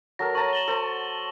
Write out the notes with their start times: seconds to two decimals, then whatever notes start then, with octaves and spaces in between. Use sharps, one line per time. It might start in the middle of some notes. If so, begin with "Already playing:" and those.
0.19 F#3 A4 A#4 A#6
0.35 C#5 A5 A#5 C#6 F#7
0.53 E7 F#7 G7
0.68 A4 C5